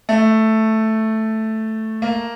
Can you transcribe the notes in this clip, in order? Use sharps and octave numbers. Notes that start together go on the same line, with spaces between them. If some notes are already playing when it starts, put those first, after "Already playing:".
A3
A#3